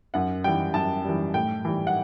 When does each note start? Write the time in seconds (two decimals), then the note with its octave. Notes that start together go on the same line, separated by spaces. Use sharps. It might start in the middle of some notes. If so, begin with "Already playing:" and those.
0.14 F#2 F#5
0.44 E3 G3 G5
0.74 F#2 A5
1.04 E3 G3
1.34 A2 G5
1.65 E3 G3
1.87 F#5